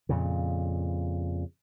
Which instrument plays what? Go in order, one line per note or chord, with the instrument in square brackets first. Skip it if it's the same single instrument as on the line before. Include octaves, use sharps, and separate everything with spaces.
[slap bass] F2 A#2 C#3